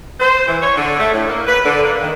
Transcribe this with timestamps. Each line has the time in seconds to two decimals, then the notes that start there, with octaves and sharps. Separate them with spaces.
0.20 C5
0.47 E3
0.61 C#5
0.76 D3
0.99 A3
1.13 A2
1.28 A#3
1.47 B4
1.64 D3
1.84 A#3
2.01 D#3